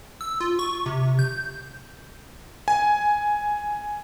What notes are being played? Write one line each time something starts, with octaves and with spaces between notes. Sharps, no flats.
E6
F4
C#6
C3
G6
G#5